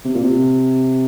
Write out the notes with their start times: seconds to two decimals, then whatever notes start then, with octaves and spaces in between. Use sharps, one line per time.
0.05 C3
0.15 A#2
0.24 C3